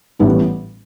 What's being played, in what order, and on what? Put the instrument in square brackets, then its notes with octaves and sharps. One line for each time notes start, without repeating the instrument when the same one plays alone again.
[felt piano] A1 A2 E3 G3 B3 E4